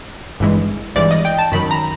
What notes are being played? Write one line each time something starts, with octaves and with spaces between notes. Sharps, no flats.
G#1 G2 E3 G#3
G#1 G2 E3 G#3 D5
D#5
G5
A5
F#2 D#3 F#3 B5
A#5